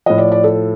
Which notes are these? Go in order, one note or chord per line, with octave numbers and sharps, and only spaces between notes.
A2 F3 D#5
D5
D5
A4